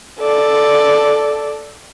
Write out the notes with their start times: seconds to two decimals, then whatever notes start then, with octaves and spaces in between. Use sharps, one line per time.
0.20 A4 D5